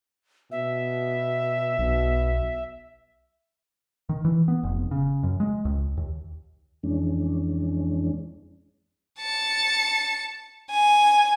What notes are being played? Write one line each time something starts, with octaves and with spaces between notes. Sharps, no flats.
B2 E5
B1 B2
D#3
E3
B3
F1
C#3
F#2
G#3
C#2
D#2
F2 E3 G#3 C#4 D4
A5 C#7
G#5